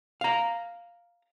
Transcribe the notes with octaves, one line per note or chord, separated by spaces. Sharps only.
F5 A#5